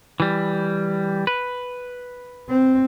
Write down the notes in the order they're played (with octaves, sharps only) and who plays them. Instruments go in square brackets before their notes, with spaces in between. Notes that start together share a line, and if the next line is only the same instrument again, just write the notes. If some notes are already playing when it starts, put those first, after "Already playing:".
[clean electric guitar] E3 G3
B4
[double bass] C4